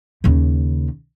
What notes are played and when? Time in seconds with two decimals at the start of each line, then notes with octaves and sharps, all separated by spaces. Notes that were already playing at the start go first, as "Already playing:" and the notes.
0.24 D#2 C#3